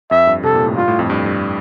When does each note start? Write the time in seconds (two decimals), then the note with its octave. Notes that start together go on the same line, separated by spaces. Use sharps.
0.11 F2 E5
0.27 G2
0.43 C3 A4
0.54 A#2
0.66 A2
0.76 G2 F4
0.88 A2
0.99 F2
1.10 G2
1.26 G2